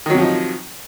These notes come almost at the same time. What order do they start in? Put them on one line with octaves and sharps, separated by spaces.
D#3 F#3 C3 F3 D#4